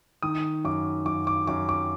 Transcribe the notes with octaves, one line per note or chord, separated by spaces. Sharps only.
D#3 D#6
F#2 D6
F#2 D6
D6
F#2 D6
D6